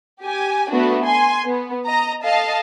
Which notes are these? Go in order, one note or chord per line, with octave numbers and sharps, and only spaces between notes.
G4 G#5
A3 B3 D4 F#4
G#5 C6
B3
D#5 A#5
A4 D#5 F5 A5